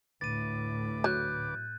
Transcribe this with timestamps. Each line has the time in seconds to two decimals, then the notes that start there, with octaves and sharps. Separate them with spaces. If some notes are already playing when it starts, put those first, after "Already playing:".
0.21 D2 A2 B4 D6 A6 D#7
1.04 F#3 F#6 G6